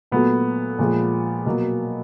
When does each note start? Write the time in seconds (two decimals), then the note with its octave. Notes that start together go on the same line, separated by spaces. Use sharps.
0.11 A#2 F#3 A3 B3
0.79 A#2 F3 G#3
1.46 B2 F#3 A#3